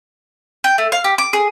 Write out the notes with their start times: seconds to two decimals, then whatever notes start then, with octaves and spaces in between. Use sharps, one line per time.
0.64 G5
0.78 A3
0.92 F5
1.04 G4
1.18 D6
1.33 G#4